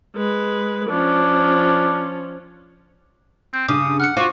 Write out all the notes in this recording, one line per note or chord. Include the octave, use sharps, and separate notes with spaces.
G#3 B4
F3 C#4 D4
C4 G6
G2 C#3 D6 D#6
F#5 F6 F#6 C#7
F4 F#4 C5 C#6 D6